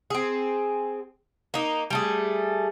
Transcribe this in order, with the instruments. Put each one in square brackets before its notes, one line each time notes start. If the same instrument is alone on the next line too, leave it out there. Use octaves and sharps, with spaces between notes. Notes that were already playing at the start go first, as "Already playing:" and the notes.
[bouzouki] C4 G#4
A#3 D#4
G3 A3 G#4